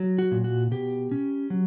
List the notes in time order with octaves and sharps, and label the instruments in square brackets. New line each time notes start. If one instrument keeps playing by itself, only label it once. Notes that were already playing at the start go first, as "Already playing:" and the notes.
Already playing: [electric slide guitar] F#3
F#4
A#2
F#4
B2 G4
C#4
F#3